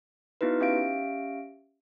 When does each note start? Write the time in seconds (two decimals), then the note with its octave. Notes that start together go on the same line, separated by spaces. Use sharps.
0.41 B3 D#4 E4 F#4 B4
0.60 C#4 G4 E5 F5 D7